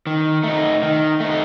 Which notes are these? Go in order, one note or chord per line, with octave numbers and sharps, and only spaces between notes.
D#3
A3 D#4
D#3
A3 D#4